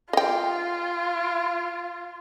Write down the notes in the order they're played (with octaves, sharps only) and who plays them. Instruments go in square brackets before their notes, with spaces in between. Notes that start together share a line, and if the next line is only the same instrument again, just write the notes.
[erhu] F4 [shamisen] D#5 G5